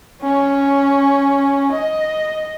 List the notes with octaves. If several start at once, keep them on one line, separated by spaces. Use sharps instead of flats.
C#4
D#5